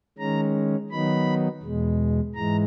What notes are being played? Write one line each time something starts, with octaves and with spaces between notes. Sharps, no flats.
D#3 G#3 C#4 A#5
D#3 F#3 B3 D#4 B5
E2 B2 G#3
G#2 E3 G#3 A#5